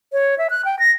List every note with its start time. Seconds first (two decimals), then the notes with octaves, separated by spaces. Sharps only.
0.13 C#5
0.38 E5
0.50 F#6
0.65 G5
0.79 A#6